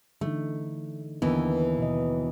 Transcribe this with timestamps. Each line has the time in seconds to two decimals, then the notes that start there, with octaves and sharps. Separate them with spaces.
0.21 D3 E3 A3 D#4
1.22 D#2 D3 E3 B3 A#4
1.79 B2 D#5